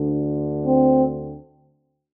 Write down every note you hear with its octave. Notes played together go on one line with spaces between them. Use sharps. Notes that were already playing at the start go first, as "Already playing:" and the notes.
Already playing: D2 D3
C4